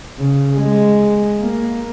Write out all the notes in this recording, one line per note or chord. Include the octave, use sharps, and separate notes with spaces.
C#3
G#3
A#3